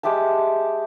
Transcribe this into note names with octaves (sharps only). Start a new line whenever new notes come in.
G#3 G4 E5 A5